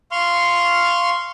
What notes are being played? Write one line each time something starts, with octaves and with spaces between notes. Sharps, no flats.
F5 C6 C#6 F6